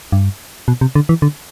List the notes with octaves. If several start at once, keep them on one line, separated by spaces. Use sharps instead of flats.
G2
B2
C3
D3
E3
D3